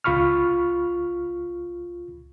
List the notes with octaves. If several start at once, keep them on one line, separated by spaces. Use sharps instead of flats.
C#2 F4 B5 C#6 F6